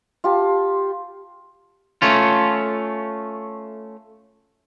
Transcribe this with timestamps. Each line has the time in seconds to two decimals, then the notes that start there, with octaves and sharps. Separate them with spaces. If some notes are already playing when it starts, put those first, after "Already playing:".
0.24 F4 G4 A5
2.02 A3 C#4 F4